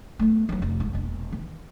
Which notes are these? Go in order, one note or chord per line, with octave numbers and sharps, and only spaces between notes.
A3 B3
E3 F#3
F1 F3
G#2
E1 A#2
D#3 E3